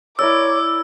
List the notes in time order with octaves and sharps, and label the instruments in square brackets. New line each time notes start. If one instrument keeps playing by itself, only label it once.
[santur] E4 A#4 D5 [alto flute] C#5 [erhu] D6 [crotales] E6